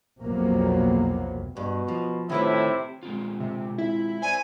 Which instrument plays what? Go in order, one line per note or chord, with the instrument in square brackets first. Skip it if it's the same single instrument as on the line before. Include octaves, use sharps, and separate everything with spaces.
[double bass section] B1 F2 C3 F#3 A#3 B3
[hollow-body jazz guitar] G2 [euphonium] B2
[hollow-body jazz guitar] F3
[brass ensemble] A2 E4 [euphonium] C3 [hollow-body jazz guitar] D#3 F4 B4
[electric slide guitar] G#3 C4 F4
[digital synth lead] C3
E4
[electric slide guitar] C5 D5 [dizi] G#5